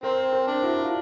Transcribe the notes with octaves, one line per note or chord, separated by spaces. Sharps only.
C4 A#4 C5
A#4 C5
D4
E4 F#4
F4